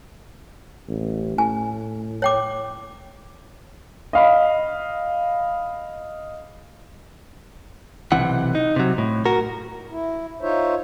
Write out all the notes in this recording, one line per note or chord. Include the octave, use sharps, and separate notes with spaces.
A1
A2 G#5
C#5 G5 D6
D#5 F5 B5
B1 C3 E3 F#5
D#4
C3 F#3
A2
F#4 A#4
E4
D#4 F4 C5 C#5 E5